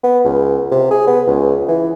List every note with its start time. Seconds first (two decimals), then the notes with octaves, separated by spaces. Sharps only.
0.03 B3
0.25 C#2
0.71 C3
0.91 G#4
1.07 B3
1.27 C#2
1.68 E3